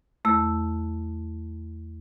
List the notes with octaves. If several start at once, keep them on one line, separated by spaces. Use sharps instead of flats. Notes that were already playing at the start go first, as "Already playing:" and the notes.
E2 A3 E6